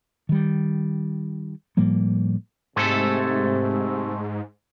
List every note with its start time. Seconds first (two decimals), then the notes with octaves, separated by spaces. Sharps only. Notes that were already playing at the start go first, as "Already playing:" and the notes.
0.29 D#3 G3
1.77 A2 F3 G3 A#3
2.76 G#2 C3 G#3 A3 A4